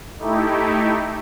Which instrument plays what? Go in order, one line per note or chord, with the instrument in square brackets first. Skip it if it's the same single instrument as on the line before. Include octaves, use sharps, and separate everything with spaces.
[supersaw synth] A3 D#4 E4 G4